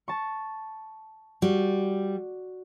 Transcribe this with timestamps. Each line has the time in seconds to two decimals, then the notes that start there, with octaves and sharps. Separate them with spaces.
0.08 A5 C#6
1.42 G3 F#4